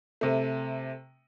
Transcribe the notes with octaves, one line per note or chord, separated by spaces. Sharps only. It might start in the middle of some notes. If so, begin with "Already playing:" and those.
C3 A3